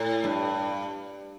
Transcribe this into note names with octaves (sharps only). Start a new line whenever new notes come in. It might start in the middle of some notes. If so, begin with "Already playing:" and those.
Already playing: A2
G2